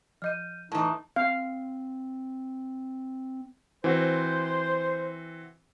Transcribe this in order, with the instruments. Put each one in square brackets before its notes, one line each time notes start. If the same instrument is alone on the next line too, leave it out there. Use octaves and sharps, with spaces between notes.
[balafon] F3 D#5 [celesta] F6 G6 D#7
[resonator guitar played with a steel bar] A2 E3 [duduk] D#4 [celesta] A5
[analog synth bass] C4 [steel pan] F5
[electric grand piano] E3 C4 F#4 [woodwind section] C5